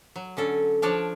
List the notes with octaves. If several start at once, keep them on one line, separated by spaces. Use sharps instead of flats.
F#3
D3 C#4 A4
F3 D4 C#5 D5 A5